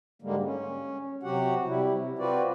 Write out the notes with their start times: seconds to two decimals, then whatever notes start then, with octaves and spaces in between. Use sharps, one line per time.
0.22 G#2 D3 G3 G#3 A#3
0.43 C#4
1.23 C3 F#3 F#4 G4 F#5
1.65 C3 G3 E4
1.94 C3
2.19 C4 F4 F#4 B4 D5